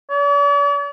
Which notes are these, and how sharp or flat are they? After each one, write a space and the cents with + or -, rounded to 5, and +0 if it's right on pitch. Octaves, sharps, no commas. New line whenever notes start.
D5 -45